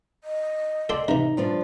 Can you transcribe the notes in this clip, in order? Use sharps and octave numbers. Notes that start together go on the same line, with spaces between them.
D#5
A4 D5 G5 C6
C3 E3 D#4
G2 F3 D4